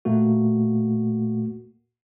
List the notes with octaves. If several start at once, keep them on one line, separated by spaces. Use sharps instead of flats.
A#2 A3 A#3 F#4